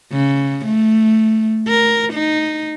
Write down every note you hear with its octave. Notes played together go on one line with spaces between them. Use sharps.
C#3
A3
A#4
D#4